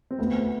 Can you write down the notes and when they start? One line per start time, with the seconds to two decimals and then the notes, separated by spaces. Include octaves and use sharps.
0.11 C4
0.19 D2 B3